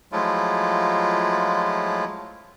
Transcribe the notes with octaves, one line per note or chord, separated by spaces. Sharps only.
F3 F#3 G#3 A3 E4 F4